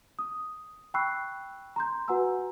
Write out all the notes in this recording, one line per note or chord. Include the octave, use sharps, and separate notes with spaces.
D#6
G5 B5 C#6 E6 F#6 C7
A#5 C6 G6
F#4 B4 F#5 G#5 A#5 E6